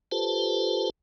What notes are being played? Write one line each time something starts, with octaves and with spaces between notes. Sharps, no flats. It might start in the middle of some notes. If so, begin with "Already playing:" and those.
F4 G4 A4 B4 C5 A5